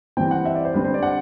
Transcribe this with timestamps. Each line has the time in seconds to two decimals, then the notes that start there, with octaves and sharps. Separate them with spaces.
0.17 E3 G3 C4 G5
0.31 F#5
0.45 E5
0.55 D5
0.65 C5
0.74 D3 G3 C4 B4
0.84 C5
0.94 D5
1.03 F#5